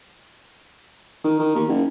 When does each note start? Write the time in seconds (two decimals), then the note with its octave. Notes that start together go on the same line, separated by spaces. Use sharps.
1.24 D#3
1.39 D#3
1.55 D#2
1.68 F#1